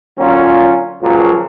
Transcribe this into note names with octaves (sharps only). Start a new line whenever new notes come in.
A#2 D3 F#3 C#4 F4
C#2 F#2 A#2 F3 F#3